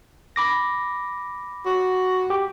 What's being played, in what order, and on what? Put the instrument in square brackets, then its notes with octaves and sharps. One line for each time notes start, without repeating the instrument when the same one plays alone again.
[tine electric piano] B5 D6 A#6
[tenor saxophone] F#4
[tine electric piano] G4